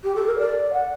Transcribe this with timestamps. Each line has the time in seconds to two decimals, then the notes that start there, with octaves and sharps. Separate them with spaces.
0.04 G4
0.15 A4
0.27 A#4
0.39 D5
0.73 F#5